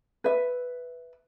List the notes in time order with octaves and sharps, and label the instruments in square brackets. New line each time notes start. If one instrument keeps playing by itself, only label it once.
[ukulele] B4 E5